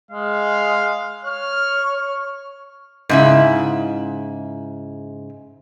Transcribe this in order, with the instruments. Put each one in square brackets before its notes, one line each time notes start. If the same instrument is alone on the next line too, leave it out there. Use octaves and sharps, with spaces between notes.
[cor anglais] G#3 [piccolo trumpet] F5
[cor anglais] C#5 [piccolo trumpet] F6
[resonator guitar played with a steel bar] G#2 C#3 E4